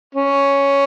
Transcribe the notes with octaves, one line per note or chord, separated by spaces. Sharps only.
C#4